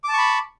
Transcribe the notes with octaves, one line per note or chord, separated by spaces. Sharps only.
A5 B5 C#6 D6